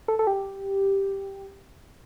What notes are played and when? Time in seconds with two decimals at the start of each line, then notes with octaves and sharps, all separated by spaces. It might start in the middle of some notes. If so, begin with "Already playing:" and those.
0.08 A4
0.19 A4
0.27 G4